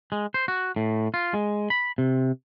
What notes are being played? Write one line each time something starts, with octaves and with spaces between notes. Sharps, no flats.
G#3
C5
F#4
A2
F4
G#3
B5
C3